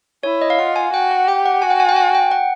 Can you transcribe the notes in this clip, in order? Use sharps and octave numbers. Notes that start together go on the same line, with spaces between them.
E4 C#5
D#5
F5
F4 F#5
G#5
F#4 G5
F#5
G4 G5
F#5
F#4 G#5
G5
G#5
G5
G#5
G5
F#5